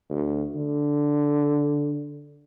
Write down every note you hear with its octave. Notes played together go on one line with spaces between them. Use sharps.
D2
D3